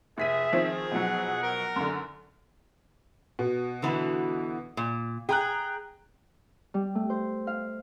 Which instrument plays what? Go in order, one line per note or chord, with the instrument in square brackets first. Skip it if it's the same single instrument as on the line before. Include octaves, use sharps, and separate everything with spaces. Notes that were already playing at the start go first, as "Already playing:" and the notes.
[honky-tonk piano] F1 B6 D#7 [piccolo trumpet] G#4 [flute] E5
[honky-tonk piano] D#3 F3 C4 [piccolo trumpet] G#4
[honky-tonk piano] B2 F3 F#3 [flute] F#5
[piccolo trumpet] A#4
[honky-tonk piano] F#2 D3
[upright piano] B2
[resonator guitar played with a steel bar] D3 E3 B3
A#2
[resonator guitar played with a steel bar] G#4 [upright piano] G5 A#5 F#6
[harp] G3
A3
C5
F5